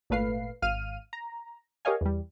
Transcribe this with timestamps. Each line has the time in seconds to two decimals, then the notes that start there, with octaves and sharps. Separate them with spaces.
0.10 G#1 A#2 A3 B4 F5 C7
0.62 G#1 F5 F6 D#7
1.13 A#5
1.85 G4 A#4 C#5 D#5 F5 G#5
2.01 E2 G3